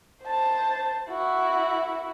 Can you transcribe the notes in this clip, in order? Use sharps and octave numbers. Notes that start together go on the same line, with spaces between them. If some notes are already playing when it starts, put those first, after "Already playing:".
C5 A5
E4 F#4